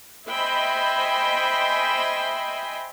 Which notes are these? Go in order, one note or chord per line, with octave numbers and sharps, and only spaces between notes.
C5 D#5 E5 G5 G#5 B5